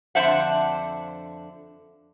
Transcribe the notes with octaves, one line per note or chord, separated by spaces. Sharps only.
F2 D3 D4 C5 E5 F#5